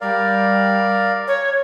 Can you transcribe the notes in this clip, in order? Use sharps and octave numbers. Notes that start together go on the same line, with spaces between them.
G3 A#4 D5 F5
C#5